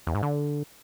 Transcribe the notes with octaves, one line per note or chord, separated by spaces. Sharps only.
E2
G#2
D3